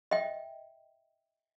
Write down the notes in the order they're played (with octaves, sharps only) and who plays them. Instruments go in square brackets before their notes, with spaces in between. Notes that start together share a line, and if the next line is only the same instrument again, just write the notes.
[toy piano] D#5 E5 G5